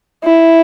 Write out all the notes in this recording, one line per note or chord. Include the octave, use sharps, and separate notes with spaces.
E4